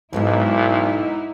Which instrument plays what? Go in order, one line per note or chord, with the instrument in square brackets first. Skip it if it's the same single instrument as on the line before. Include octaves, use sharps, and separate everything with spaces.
[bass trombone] B1 [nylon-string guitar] F2 G#2 [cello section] D#4 E4